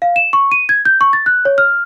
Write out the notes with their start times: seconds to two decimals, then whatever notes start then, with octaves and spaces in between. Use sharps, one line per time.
0.02 F5
0.16 E7
0.33 C#6
0.52 D#7
0.69 G#6
0.85 G6
1.01 C#6
1.13 A6
1.26 F#6
1.45 C#5
1.58 F6